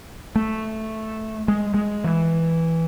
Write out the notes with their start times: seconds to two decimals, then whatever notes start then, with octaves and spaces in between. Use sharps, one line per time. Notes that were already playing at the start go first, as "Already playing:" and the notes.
0.36 A3
1.48 G#3
1.74 G#3
2.04 E3